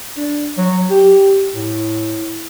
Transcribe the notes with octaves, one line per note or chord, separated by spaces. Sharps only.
D4
F#3
G4
A2